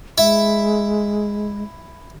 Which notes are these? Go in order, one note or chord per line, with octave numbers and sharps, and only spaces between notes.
G#3 E4 E5 B5